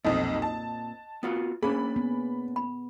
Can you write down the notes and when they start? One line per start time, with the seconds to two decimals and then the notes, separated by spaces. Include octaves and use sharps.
0.05 B1 F2 A#2 C4 D#5 D#6
0.42 A5
1.23 B3 F4 F#4
1.63 A#3 C#4 D4 G#4 B5
1.96 B3
2.56 B5